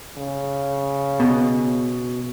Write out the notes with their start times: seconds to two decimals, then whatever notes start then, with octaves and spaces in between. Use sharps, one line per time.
0.18 C#3
1.20 B2